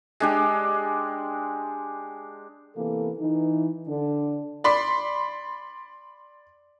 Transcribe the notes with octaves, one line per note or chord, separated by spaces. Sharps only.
G#3 D4 G4
C3 E3 A#3 B3 A4
E3 D#4
D3 D4
D5 B5 C6